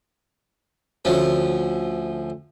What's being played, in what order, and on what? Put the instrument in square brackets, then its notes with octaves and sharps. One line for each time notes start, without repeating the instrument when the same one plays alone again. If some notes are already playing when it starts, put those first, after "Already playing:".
[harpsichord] D2 F3 C#4